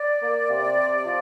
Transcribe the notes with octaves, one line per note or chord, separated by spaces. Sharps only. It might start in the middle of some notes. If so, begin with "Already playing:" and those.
Already playing: D5
A#3
C3
C3
F3